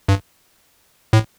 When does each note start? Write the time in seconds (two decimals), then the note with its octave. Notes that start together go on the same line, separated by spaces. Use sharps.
0.09 G2
1.13 A2